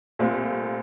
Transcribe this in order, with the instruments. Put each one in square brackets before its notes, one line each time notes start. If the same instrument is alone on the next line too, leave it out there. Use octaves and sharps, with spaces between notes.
[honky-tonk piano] C2 A#2 A3 C4 F4